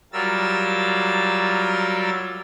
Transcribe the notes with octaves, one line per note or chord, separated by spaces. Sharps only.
F#3 G3 F4 A#4 E6 A6